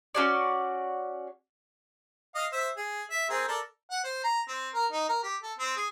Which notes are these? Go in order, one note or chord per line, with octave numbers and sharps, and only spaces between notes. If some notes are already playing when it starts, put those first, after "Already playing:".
C#4 F#4 D5
D#5 F5
C5 E5 E6
G#4
E5
C4 G#4 A#4
A4 A#4 D5
F#5
C5
A#5
C4
A#4
D#4
A#4
G4
A4
C4
G#4